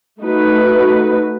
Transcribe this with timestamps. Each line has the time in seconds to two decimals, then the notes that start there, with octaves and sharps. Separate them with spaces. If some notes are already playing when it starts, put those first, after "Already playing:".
0.21 A3 D#4 F#4 B4